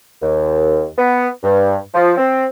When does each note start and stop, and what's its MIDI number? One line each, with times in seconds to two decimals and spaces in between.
0.21 0.86 39
0.97 1.28 59
1.42 1.77 43
1.94 2.12 53
2.18 2.45 60